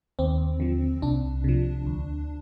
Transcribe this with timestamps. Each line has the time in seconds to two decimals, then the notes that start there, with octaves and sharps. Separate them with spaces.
0.19 D#2 C4
0.60 D3 F3
1.02 C2 D4
1.44 C3 F3
1.86 D2